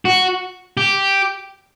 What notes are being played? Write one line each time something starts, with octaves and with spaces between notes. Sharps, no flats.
F#4
G4